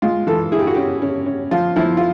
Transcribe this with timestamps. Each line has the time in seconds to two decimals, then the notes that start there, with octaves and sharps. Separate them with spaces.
0.02 G#3 F4
0.27 E3 A4
0.52 E4 G#4
0.59 G4
0.67 F#4
0.74 C#4 G4
1.02 C#4
1.26 C#4
1.51 F3 F4
1.76 F3 E4
1.97 F4